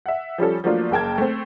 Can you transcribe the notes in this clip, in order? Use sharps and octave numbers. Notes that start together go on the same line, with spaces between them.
E5 F#5
F3 G3 C#4 A4
F3 F#3 A3 A#3 D4 F4
F#1 A#3 G5 A5 G#6
A3 C4